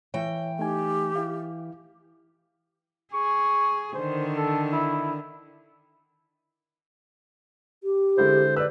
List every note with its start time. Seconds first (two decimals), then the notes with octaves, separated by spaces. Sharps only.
0.14 E3 C#5 G5
0.59 A3 D#4 G4 G#5
1.16 E4 F5
3.13 G#4 C#6
3.95 D3 D#3 C5
4.37 A4
4.73 E4
7.84 G4
8.18 D3 G#3 E4 C5
8.56 B4 D5 E6